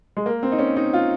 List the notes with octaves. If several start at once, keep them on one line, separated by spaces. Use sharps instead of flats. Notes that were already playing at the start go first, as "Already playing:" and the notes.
G#3
A#3
C4
D#4
C#4
D#4
F4